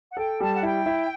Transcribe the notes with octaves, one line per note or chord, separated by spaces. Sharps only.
F#5
A4 G5
G3 A5
F#5
E4 G5
E4